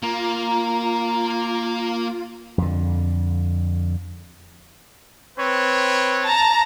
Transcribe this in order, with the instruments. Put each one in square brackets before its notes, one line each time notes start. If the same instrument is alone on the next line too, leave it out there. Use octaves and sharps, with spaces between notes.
[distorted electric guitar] A#3 [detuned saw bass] F4 [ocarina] A#5
[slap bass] F2 D3
[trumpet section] C4 B4 C#5
[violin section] A5 A#5